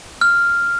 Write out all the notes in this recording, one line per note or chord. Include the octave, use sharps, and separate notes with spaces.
F6